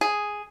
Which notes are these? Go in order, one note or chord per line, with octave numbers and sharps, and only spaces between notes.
G#4